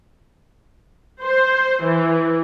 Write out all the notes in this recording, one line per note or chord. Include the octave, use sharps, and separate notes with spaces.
C5
E3